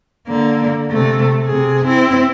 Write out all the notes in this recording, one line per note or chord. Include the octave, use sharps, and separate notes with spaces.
D3 A#3
C3 A3
C3 G#4
C4 E4